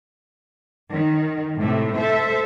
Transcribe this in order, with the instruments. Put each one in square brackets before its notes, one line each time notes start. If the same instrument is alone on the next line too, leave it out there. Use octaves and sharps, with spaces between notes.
[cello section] D#3
A2 C3 A3
A4 C5 E5